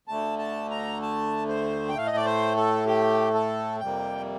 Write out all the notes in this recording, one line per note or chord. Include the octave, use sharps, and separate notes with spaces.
D2 D3 A3 A5
A5
A#5
A5
C5
G5
A2 A3 F5
D#5
D5
C5
A4
G4
A4
F2 C3 G3 A#3 G5